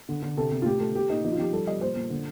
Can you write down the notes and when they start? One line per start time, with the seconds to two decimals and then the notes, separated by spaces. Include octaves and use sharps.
0.09 D3
0.22 D3
0.37 C3 A4
0.51 C3
0.62 F4
0.66 A2 G4
0.80 A3 A4
0.95 A3 G4
1.10 A#2 D#4
1.24 F3 D#4
1.32 F4
1.39 F3 G4
1.53 G3 A4
1.67 G3 D#5
1.81 A#2 C5
1.96 A#2
2.10 D3